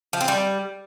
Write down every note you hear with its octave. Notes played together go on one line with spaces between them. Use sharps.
F3
C4
G3